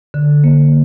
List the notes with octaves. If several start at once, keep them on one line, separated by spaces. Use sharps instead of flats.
D3
A#3